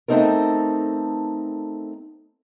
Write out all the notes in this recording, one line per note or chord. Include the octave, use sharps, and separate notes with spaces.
A3 B3 C4 D#4 A4 A#4